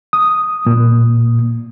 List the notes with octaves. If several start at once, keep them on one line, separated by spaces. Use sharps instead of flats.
D#6
A#2